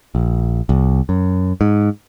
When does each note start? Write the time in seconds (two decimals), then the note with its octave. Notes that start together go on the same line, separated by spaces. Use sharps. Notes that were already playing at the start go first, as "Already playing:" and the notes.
0.15 A#1
0.69 C2
1.09 F#2
1.61 G#2